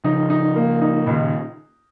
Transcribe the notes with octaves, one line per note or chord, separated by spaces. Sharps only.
C#3 F3 D#4
D#4
A#3
D#4
C#2 A#2 D#3